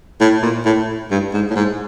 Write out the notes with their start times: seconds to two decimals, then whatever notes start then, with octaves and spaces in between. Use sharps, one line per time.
0.21 A2
0.42 A#2
0.65 A2
1.11 G2
1.34 G#2
1.50 A2
1.56 G#2